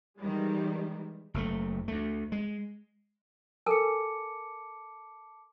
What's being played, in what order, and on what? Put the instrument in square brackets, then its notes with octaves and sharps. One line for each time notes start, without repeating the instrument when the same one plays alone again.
[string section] D#3 E3 G3 G#3
[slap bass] F#1 C3 A3
D2 A3
G#3
[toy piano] A4 A#4 G#5 [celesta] A5 D6 C#7